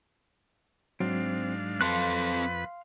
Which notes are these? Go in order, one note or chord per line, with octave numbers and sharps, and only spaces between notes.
G#2 F#3 C4 D4 F5
F2 C4 A4 B4 F5 B5 C6 F#6